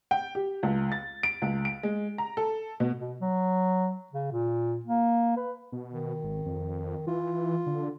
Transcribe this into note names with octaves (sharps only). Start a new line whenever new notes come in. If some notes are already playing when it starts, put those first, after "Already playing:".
G5
G4
C#2
A6
D7
C#2
D7
G#3
A#5
A4
B2
B2
F#3
C#3
A#2
A#3
B4
B2
D#3
G#1
F2
E3 F4
D3